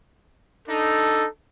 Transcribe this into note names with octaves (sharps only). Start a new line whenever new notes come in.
D4 D#4 A4